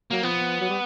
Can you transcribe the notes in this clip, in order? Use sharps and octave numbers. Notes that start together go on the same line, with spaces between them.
F#3 A#3
F3 B3
F#3
G3